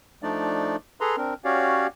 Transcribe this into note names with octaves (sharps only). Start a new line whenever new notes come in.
F3 A3 D4 D#4 D5
G#4 A4 B4 A#5 C6
C4 D4 A#4
C#4 F#4 G4 C#5 D5 F5